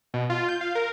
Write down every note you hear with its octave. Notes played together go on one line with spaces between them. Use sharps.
B2
F4
G6
F5
A#4